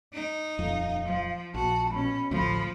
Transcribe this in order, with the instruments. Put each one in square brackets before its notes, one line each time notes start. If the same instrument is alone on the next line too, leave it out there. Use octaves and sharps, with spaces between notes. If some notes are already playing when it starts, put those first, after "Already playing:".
[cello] D#4
[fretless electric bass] D#1 F2 [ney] F5
[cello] F3
[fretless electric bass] A#1 [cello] F#4 [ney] A5
[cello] B2 C#4 [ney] B5
[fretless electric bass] A1 D2 [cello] F3